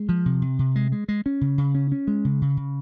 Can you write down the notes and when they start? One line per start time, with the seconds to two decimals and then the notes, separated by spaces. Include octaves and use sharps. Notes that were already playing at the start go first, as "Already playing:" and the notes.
Already playing: G#3
0.09 F3
0.26 C3
0.42 C3
0.59 C3
0.76 G#3
0.92 G#3
1.08 G#3
1.26 C#4
1.41 C#3
1.58 C#3
1.75 C#4
1.92 C#4
2.07 G#3
2.25 C#3
2.42 C#3
2.57 C#3